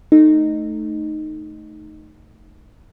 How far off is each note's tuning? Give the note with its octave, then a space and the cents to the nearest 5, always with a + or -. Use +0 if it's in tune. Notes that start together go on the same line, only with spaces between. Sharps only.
A3 +0 D#4 -10